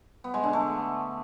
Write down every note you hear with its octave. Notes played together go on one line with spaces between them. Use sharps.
B3
G#3
D3
A3